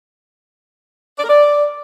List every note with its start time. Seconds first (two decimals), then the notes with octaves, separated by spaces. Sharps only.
1.19 D5
1.24 A#4
1.29 D5